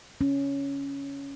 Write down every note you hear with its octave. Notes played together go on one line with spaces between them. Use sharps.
C#4